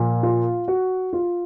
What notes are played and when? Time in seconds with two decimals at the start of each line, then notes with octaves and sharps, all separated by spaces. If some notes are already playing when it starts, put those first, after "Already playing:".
Already playing: A#2 F3
0.23 F4
0.68 F#4
1.13 F4